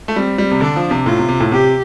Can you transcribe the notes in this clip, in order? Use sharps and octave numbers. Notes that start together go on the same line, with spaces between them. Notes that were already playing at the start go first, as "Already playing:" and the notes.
A3
G3 C4
G3
C3
D3 D4
F3
C3
A2 F4
C3
C3
A2
C3 G4